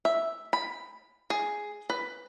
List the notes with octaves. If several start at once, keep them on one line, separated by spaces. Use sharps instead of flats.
E5
B5
G#4
B4